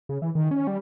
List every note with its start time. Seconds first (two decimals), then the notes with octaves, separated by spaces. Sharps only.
0.09 C#3
0.22 E3
0.35 D#3
0.51 C#4
0.67 G3